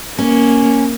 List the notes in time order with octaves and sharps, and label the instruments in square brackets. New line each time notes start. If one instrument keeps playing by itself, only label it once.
[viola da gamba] A#3 [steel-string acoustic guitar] C#4